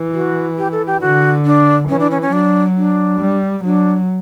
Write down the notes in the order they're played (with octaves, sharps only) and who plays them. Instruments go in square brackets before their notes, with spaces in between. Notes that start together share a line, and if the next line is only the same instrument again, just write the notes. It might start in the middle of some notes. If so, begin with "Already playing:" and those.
Already playing: [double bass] E3
[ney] F#4
G4
A4
G4
[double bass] D3 [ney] F#4
[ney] D4
[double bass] E3 [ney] C#4
[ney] D4
C#4
C#4
[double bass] F#3 [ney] D4
[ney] D4
[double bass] G3
[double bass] F#3 [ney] D4